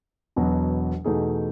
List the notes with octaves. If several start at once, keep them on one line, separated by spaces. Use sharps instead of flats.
E1 E2 B2 F#3 B3
E2 B2 A3 D#4 G#4